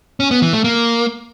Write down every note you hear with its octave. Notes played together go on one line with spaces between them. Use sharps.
C#4
B3
E3
A3
A#3